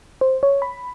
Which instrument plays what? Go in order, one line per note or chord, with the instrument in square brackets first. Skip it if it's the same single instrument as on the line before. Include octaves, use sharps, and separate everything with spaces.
[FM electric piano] C5
C#5
B5